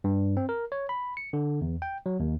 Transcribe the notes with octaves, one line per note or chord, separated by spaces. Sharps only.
G2
C4
A#4
C#5
B5
C#7
D3
E2
G5
F#3
D#2